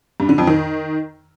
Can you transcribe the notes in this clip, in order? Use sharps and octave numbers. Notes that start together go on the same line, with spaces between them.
G2
D3
F2
D#3